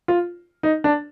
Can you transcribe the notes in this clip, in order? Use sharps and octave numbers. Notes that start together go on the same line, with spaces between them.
F4
D#4
D4